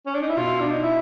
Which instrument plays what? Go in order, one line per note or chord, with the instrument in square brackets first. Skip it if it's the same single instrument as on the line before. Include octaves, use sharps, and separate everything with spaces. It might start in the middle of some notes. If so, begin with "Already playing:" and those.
[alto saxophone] C#4
D4
D#4
E4
[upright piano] B2 [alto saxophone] F4
[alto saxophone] D4
D#4
E4